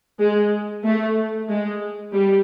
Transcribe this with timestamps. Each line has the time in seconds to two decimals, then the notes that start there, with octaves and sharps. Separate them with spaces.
0.19 G#3
0.84 A3
1.48 G#3
2.13 G3